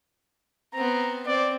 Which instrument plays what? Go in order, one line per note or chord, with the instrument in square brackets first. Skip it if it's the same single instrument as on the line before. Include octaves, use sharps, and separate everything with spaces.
[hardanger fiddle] B3 C4 [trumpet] A#5
[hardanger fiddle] C4 [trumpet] D5